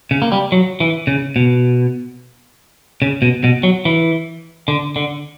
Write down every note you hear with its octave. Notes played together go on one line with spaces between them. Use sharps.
C#3
A#3
G3
F#3
E3
C#3
B2
C#3
B2
B2
F#3
E3
D3
D3